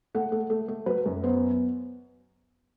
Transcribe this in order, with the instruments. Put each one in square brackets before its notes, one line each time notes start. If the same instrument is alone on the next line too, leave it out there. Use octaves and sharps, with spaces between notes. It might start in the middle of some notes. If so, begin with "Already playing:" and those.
[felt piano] A3 F#5
A3
A3
A3
F#3 B4
F#2
B3 C5